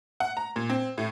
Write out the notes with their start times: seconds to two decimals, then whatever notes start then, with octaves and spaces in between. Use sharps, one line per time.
0.20 F#5
0.37 A#5
0.56 A#2
0.70 C4
0.98 A2